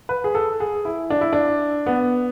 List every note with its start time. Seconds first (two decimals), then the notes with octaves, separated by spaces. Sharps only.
0.09 B4
0.24 G#4
0.35 A4
0.60 G#4
0.85 E4
1.10 D4
1.21 E4
1.33 D4
1.86 B3